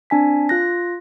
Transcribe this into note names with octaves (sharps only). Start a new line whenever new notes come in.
C4 D4 G#5 B6
F4 F#6 A#6